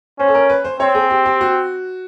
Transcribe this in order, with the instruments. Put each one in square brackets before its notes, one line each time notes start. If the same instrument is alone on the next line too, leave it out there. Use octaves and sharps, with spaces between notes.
[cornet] C#4 [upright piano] C5
[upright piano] A4
A#4
B4
C5
[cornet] C4 [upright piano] C#5
[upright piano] G#4
G4
G4
F#4